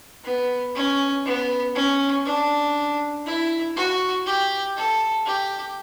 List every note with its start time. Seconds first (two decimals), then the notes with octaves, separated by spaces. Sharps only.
0.24 B3
0.75 C#4
1.25 B3
1.75 C#4
2.25 D4
3.26 E4
3.76 F#4
4.26 G4
4.76 A4
5.26 G4